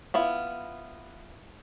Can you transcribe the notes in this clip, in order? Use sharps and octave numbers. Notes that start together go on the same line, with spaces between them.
B3 E4 F4